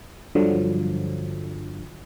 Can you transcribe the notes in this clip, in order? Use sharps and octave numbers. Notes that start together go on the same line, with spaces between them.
G2 D3 F3 F#3